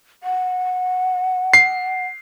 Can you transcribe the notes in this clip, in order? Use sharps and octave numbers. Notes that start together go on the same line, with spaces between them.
F#5
C7